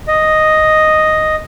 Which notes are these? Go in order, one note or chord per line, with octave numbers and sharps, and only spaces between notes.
D#5